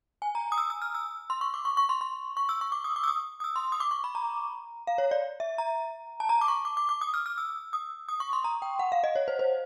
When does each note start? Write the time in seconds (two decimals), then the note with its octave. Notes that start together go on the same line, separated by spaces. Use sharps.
0.22 G#5
0.35 A#5
0.52 D#6
0.58 E6
0.70 E6
0.82 F6
0.95 E6
1.30 C6
1.41 C#6
1.54 D6
1.65 C#6
1.77 C#6
1.89 C6
2.01 C6
2.37 C#6
2.49 E6
2.61 C#6
2.72 D6
2.84 D#6
2.96 D6
3.04 E6
3.08 D#6
3.40 D#6
3.44 E6
3.56 C6
3.72 D#6
3.80 D6
3.91 C#6
4.04 B5
4.15 A#5
4.87 F5
4.98 C#5
5.11 D5
5.40 E5
5.58 A#5
6.20 A5
6.29 A#5
6.41 D6
6.48 C#6
6.65 D6
6.77 D6
6.89 D6
7.01 D#6
7.14 F6
7.26 F6
7.38 E6
7.73 D#6
8.09 D#6
8.20 C#6
8.33 C6
8.44 A#5
8.62 G5
8.79 F#5
8.92 F5
9.04 D#5
9.16 C#5
9.28 C5
9.39 C5